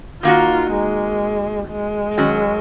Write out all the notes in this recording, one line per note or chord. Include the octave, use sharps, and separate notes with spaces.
D#3 A#3 D#4 F4 F#4
G#3
G#3
D#3 F#3 C#4 F#4